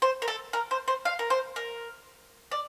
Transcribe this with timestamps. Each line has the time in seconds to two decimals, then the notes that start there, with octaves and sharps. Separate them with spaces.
0.02 C5
0.22 A#4
0.28 A4
0.53 A#4
0.71 C5
0.88 C5
1.05 F5
1.19 A#4
1.30 C5
1.56 A#4
2.51 D5